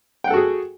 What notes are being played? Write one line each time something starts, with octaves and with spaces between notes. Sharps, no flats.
F#4 G#4 A4 F#5 G5